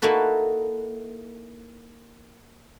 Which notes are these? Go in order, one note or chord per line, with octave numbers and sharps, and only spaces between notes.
A#3 D#4 E4 F#4 A4 B4